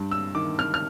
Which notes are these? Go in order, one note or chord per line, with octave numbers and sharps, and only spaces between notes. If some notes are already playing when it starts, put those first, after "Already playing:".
Already playing: G2
E6
D#3 D6
F6
F6